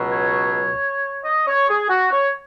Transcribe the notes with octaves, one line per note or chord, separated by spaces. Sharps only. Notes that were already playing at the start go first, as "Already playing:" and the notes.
Already playing: C#2 B2 F#3
C#5
D#5
C#5
G#4
F#4
C#5